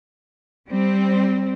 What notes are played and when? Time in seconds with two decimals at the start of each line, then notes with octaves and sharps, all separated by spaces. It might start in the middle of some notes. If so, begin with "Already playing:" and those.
0.69 G3 C4